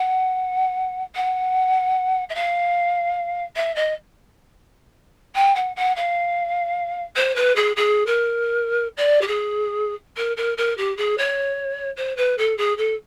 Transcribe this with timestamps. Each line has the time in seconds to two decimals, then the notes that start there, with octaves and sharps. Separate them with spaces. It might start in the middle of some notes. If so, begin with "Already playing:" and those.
Already playing: F#5
1.15 F#5
2.29 E5
2.34 F5
3.56 E5
3.75 D#5
5.35 G5
5.55 F#5
5.75 F#5
5.95 F5
7.16 C5
7.35 B4
7.55 G#4
7.76 G#4
8.06 A#4
8.97 D5
9.21 G4
9.27 G#4
10.16 A#4
10.36 A#4
10.57 A#4
10.77 G4
10.97 G#4
11.17 C#5
11.96 C5
12.16 B4
12.38 A4
12.57 G#4
12.77 A4